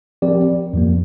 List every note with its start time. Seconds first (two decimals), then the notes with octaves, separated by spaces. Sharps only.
0.22 F3 C4 G4 A#4 D5
0.73 F2 F3 A#3